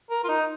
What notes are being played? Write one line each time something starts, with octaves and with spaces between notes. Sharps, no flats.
A#4
F4
D#4